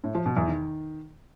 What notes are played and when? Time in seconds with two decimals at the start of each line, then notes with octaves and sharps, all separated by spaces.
0.04 A2
0.15 F3
0.26 B2
0.37 E2
0.48 D#3